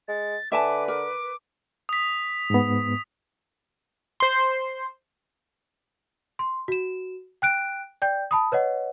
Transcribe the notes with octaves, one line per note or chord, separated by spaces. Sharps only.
G#3 A6
D3 B4 E5 G#5 A5 D6
A#4 D6
D#6 B6
G#2 B3
C5 C6
C6
F#4 E7
G5 F#6 D7
D5 G5 G6
A5 B5 D#6
B4 C#5 D#5 F#5